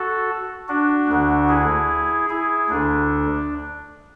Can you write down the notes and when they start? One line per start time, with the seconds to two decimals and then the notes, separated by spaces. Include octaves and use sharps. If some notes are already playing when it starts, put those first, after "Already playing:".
Already playing: F#4 A4
0.68 D4 F#4
1.09 D2 D3
1.49 E4 G#4
2.29 E4 G#4
2.70 D2 D3 D4